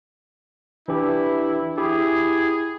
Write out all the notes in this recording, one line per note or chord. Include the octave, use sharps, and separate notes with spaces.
E3 D4 E4 G4
E4 G4 G#4